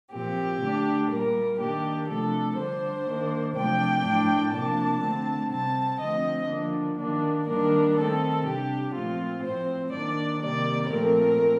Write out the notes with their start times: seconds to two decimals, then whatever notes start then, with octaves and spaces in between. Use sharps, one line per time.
0.12 A#2 F3 C4 G4
0.61 D3 A3 D4
1.10 A#2 G3 A#3 A#4
1.59 D#3 A#3 D4 G4
2.07 C3 F3 A3 D4 A4
2.57 D3 G3 D4 C5
3.06 D#3 A#3 D4
3.55 C3 F3 A3 D4 G5
4.04 A2 A3 D4
4.53 C3 F3 A#3 D4 A5
5.02 D3 A3 C4
5.51 C3 G3 C4 A5
6.00 D3 F3 A3 C4 D#5
6.49 D3 F3 A#3 D4
6.98 D#3 A#3 D4
7.47 D#3 G3 A#3 D4 A#4
7.96 D#3 A3 C4 A4
8.45 C3 G3 D4 G4
8.94 A#2 F3 A3 C4 F4
9.43 A2 F3 C4 C5
9.92 D#3 A#3 D4 D5
10.41 C3 D#3 G3 A#3 D5
10.90 A#2 F3 A3 C4 A#4